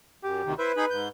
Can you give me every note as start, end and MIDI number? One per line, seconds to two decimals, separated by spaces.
0.23 0.42 42
0.23 0.53 67
0.44 0.54 38
0.44 0.54 48
0.44 0.54 51
0.59 0.72 64
0.59 1.09 71
0.59 0.72 72
0.59 0.72 76
0.77 0.86 63
0.77 0.86 68
0.77 0.86 83
0.90 1.08 44
0.90 1.08 91